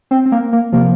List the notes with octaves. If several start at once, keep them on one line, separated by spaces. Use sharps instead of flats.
C4
C4
A#3
A#3
C3 F3 A#3